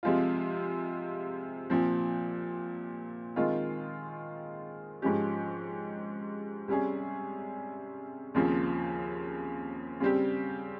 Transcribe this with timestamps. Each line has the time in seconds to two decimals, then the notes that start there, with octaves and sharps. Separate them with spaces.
0.03 C3 F3 G#3 C4 F4
1.70 A#2 F3 C4
3.36 D#3 G#3 C4 F4
5.02 G#2 F3 G#3 C#4 G4
6.68 C3 G3 C#4 G#4
8.34 D#2 C#3 F3 C4
10.00 C#3 G3 C4 G4